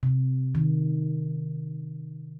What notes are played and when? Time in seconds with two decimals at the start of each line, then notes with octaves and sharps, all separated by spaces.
0.03 C3
0.55 D#3